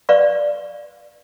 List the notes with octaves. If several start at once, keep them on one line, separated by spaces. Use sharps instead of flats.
B4 D5 F5 C#6